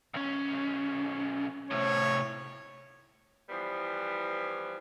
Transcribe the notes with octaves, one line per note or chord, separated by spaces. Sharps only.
B1 C#4
A2 C3 C#5
E3 F3 G3 B3